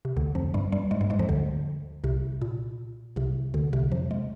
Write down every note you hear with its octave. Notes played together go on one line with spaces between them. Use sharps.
C3
D2 D3
F2 F3
G2 G3
G2 G3
G#2 G#3
G2 G3
G#2 G#3
F2 F3
D2 D3
C2 C3
A#2
C2 C3
D2 D3
C2 C3
F2 F3
G#3